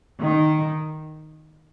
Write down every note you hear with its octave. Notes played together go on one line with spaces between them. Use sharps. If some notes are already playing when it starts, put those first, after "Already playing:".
D#3